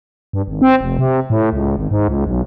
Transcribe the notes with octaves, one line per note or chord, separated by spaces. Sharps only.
G2
G#1
C4
F1
C3
A2
C#2
G#1
G#2
C#2
B1